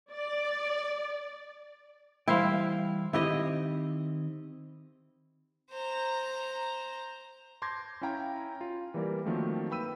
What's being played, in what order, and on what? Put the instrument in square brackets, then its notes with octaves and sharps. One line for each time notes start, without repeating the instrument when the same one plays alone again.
[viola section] D5
[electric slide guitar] E3 G3 G5 [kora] E4 C5 F5
[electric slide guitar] D#3 C4 [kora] E4 G4 D#5
[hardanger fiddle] C5 A#5
[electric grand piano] A5 C6 D6 G6 G#6 A#6
C#4 E4 F5 G5 A#5
F4
E3 G3 A#3 A#4 D5
D#3 F3 F#3 A3 A#3 C4
A#3 B4 G5 B5 E6 D#7